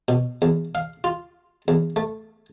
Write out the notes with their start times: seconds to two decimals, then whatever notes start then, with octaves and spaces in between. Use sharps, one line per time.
0.08 B2
0.42 E2
0.75 F5
1.04 F4
1.68 E2
1.96 A3